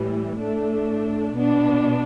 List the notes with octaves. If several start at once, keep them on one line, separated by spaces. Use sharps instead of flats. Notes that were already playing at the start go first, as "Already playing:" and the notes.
Already playing: A2 E3 G3
A2 A3 D4
B2 B3 D4